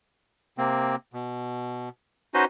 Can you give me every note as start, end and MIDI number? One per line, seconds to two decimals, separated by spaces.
0.58 0.96 48
0.58 0.96 58
0.58 0.96 60
1.13 1.89 47
2.34 2.45 61
2.34 2.45 63
2.34 2.45 66
2.34 2.45 71
2.34 2.45 72
2.34 2.45 75